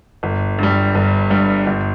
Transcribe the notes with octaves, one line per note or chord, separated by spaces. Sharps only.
G1
G2 G3
G1
G2 G3
G1